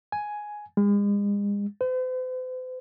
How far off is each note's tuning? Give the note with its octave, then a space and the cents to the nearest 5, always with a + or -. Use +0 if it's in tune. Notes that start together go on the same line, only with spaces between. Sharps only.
G#5 +5
G#3 -40
C5 -45